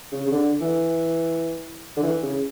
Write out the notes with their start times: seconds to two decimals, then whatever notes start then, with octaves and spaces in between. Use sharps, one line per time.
0.12 C#3
0.27 C#3
0.31 D3
0.61 E3
1.97 D3
2.03 E3
2.23 C#3